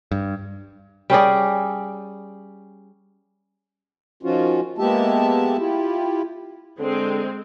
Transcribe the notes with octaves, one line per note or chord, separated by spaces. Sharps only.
G2
G3 C#4 G#4 D5
D#3 F3 C#4 F4 F#4
G#3 A#3 B3 G4 E5 A5
E4 F4 G4
D3 G#3 C4